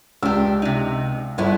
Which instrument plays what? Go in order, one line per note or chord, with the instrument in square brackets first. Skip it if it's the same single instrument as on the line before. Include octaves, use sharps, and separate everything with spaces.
[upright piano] C#2 E6 [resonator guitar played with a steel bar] D4 G4
[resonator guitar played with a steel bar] C3 D#4
[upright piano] G1 [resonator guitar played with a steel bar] G#3 B3 E4